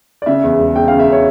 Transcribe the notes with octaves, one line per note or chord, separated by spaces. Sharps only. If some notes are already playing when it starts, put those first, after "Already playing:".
D5
C#3 E5
E2
E1
E1 G5
F5
C#3
E5
C#5